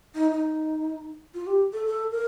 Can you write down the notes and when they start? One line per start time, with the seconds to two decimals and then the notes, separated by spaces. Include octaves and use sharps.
0.15 D#4
0.32 D#4
1.34 F4
1.47 G4
1.73 A4
1.86 A4
2.11 A#4